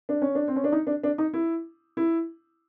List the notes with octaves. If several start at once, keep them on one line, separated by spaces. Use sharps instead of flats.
D4
C#4
D4
C4
C#4
D4
D#4
D4
D4
D#4
E4
E4